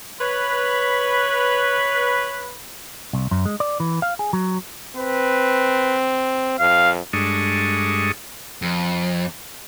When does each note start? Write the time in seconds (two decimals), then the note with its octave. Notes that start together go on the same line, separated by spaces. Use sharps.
0.20 B4 C#5 B5
3.13 C2
3.31 F#2
3.45 G#3
3.60 D5
3.80 E3
4.02 F5
4.19 G#4
4.33 F#3
4.96 C4 B4
6.60 F2 F5
7.13 G2 G#3 D4 A4 C#6 D#6
8.62 F2